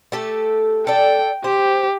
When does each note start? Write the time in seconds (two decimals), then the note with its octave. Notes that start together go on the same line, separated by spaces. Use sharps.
0.12 A3 G4 A4
0.87 A4 D5 G5
1.44 G4 C5